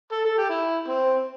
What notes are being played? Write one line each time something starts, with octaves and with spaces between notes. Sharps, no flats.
A4
A4
G4
E4
C4